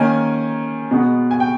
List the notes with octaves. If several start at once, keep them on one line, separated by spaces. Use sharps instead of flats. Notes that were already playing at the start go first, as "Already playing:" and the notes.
Already playing: D#3 A#3 C#4 G#5
B2 G#3 B3
G#5
G5